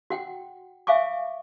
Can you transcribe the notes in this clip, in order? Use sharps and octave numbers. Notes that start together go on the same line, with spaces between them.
F#4 F#5 G5
E5 F5 G#5 C#6 D6